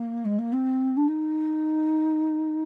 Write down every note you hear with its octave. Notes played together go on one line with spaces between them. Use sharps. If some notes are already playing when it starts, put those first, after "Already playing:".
Already playing: A#3
G#3
A#3
C4
D4
D#4